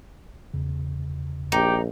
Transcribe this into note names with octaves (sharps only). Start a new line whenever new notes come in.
E2 C#3
A#1 D#4 G4